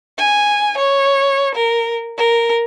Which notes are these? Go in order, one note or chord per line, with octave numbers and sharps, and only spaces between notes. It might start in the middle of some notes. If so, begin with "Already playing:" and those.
G#5
C#5
A#4
A#4